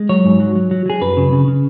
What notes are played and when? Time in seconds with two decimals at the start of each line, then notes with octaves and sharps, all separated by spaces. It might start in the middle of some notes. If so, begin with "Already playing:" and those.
Already playing: G#3
0.09 F#3 C#5
0.25 G#2
0.40 F#3
0.55 F#3
0.71 F#3
0.86 F#3 G#4
1.01 F#2 B4
1.17 C#3
1.33 C#3
1.48 C#3